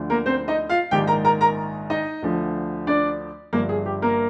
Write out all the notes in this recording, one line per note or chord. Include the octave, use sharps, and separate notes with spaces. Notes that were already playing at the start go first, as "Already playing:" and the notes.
Already playing: D2 D3 F3
A#3 A#4
C4 C5
D#4 D#5
F4 F5
A#1 G#2 D#3 G4 G5
A#4 A#5
A#4 A#5
A#4 A#5
D#4 D#5
D2 D3 F3
D4 D5
G1 G2 F3 A#3 A#4
G#4
G4
A#3 A#4